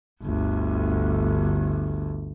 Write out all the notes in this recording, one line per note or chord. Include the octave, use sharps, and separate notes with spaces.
G1 D2